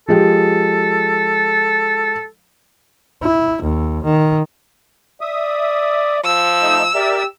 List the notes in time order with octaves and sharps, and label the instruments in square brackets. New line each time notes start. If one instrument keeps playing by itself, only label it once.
[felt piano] F3 G#3 G4 [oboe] A4
[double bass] E4
D#2
D#3
[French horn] D5 [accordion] E5 D#6
[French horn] F3 [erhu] E6
[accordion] A3 D#4
[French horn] G4 [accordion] A#4 D5 E5